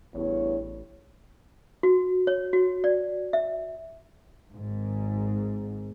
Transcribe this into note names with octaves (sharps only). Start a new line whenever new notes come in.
A1 E2 G2 C#5
F#4
C#5
F#4
D5
E5
G#1 G#2